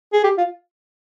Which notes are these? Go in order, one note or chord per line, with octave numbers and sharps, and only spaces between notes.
G#4
G4
F4